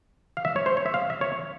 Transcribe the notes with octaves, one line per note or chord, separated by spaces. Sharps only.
F5
E5
C#5
C5
C#5
E5
F5
E5
C#5